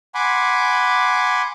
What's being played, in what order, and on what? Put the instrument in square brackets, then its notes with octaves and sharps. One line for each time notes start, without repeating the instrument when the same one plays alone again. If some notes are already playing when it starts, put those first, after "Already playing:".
[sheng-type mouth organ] F#5 G#5 B5 C6 D6